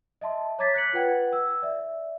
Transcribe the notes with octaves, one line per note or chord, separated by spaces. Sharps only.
D#5 E5 A5 C6
C#5 A#5 D6 G#6 A6 B6
F#6 B6 C#7 F#7
F4 B4 F#5 G5 G#6
E6
D5 E5